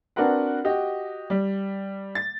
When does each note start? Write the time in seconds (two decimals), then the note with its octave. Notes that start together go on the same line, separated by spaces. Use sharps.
0.16 C4 D4 F#4 A#4 B4 F#5
0.64 F#4 G4 D#5
1.30 G3
2.15 A6